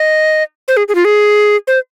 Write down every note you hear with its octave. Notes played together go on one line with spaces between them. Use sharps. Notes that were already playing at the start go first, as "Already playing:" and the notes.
Already playing: D#5
C5
G#4
G#4
F4
G#4
C5